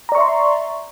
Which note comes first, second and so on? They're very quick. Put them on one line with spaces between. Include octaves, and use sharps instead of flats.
A#5 D5 C#6 E5 C6